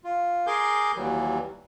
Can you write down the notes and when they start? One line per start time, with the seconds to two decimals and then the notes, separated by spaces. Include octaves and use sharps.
0.04 F4
0.47 G#4 A#4 G#5 C6 D6 G6
0.97 D#2 E3 F#3 G3